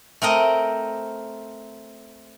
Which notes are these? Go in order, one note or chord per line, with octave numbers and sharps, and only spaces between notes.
A3 C4 A#4 D#5